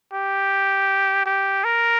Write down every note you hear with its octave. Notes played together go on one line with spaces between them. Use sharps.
G4
G4
A#4